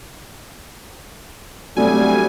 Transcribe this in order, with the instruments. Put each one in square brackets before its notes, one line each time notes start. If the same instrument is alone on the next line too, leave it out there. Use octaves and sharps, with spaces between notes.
[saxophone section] D2 G3 [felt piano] F#3 A3 C4 [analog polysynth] G#5